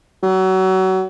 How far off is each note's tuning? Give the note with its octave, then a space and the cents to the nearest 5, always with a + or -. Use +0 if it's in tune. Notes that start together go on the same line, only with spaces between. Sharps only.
F#3 +30